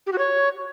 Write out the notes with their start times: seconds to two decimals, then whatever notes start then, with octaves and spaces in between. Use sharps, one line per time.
0.07 G4
0.12 F#4
0.18 C#5